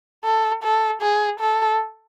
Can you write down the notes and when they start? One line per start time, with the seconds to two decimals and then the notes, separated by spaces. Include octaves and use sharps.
0.25 A4
0.63 A4
1.02 G#4
1.40 A4